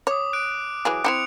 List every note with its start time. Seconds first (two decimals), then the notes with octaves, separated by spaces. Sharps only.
0.07 C#5 D6 D#6
0.33 F#6 D7
0.85 E3 F#3 G#4
1.04 C4 E4 G4 C#7 F7